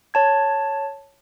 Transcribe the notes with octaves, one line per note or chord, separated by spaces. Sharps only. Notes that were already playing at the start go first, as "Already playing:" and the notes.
C#5 A5 G#6